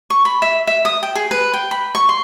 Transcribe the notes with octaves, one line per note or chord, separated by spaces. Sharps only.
C#6
B5
E5
E5
D#6
G5
G#4
B4
G5
B5
C#6
C6